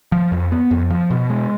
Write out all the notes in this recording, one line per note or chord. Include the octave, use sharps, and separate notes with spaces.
F3
F2
B3
F2
F3
B2
G#3